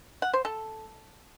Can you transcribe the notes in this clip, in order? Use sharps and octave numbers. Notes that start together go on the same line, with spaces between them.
F#5
C5
A4